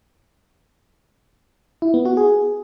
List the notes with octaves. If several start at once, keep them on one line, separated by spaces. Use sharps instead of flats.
E4
B3
F#4
G#4